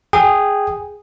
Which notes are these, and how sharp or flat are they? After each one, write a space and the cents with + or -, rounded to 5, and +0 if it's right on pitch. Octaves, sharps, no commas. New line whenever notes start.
G#4 -10 G5 -10